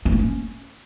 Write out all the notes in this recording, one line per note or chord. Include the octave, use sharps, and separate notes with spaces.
C#4
A#3
C#4